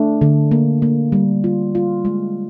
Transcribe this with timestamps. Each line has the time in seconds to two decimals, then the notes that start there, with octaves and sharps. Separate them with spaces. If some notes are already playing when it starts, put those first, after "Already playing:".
Already playing: A3 D4
0.21 D3
0.51 A#3
0.82 A#3
1.12 G3
1.44 F4
1.75 F4
2.05 G#3